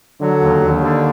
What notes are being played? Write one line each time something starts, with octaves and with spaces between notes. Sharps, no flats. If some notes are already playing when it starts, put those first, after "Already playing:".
D3 F#3
D#2
D#2
D3